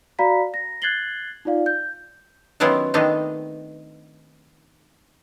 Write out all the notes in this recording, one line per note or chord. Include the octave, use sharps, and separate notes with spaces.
F#4 D5 F5 A#5 B5 B6
A#6
F#6 G#6 A6 C7 F#7 G7
D#4 F4 D5 F5
G6
D#3 F#3 B3 C#4 E4 F4
D#3 A3 B3 C4 D4 D#4